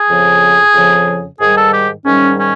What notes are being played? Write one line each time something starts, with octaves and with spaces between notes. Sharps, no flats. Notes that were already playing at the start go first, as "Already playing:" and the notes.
Already playing: G#4
F2 C#3 F3
F2 C#3 F3
G#2 D#3 G3 G#4
A4
G4
G#2 D#3 G3 C#4
C#4